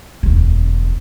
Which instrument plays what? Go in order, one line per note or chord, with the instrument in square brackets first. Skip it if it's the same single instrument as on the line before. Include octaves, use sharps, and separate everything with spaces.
[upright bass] E1 D2